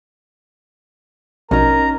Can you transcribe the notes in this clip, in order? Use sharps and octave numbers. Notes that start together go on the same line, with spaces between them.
A#1 B2 C#4 D#4 A#4 A#5